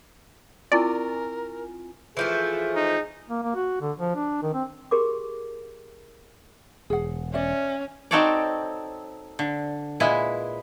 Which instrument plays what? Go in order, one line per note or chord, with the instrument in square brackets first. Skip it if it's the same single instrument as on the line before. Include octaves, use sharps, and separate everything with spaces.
[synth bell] C4 F4 G#5 [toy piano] E4 C#6 [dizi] A#4 [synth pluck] D5
[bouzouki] E3 F3 A3 [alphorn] G#4
[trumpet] D#4
[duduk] A#3
A#3
F#4
D3
F3
D4
D#3
C4
[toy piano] G4 G#4 A#4 C6 D6
[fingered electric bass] E1 [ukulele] G#4 F#5
[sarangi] C#4 [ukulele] D5 E5
[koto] C4 D#4 F#4 A4 C#5 D5
D3
A#2 G#3 E4 B4 G#5